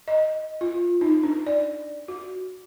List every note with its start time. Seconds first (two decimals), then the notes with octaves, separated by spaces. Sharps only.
0.08 D#5
0.61 F4
1.01 D#4
1.23 D4
1.46 D5
2.08 F#4